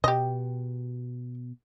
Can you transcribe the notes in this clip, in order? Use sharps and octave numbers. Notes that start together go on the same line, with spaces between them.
B2 G4 D#5